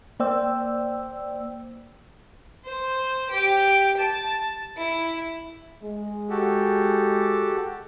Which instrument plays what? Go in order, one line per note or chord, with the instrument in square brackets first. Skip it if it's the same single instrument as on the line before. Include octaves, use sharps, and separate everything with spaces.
[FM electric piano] A#3 C5 D5 G5 E6
[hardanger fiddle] C5
G4
A5
E4
[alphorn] G#3
[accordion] F#4 G4 A4